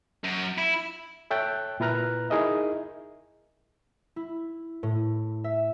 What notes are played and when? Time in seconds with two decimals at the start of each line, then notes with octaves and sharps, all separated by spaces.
0.24 F#2
0.58 E4
1.31 A4 C#5 E5 G5 A5 F#6
1.80 A#2 E4 B4 A#5 F6 F#6
2.30 D#4 E4 G#4 A#4 D#5 E5
4.16 E4
4.83 A2
5.44 E5